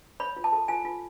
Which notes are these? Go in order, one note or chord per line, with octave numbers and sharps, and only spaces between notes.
C#5 B5
F4
A5
A4
F4 G#5
F4